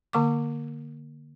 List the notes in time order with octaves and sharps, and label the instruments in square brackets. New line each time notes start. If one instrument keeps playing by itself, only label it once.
[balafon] D3 A#3 C#6 D6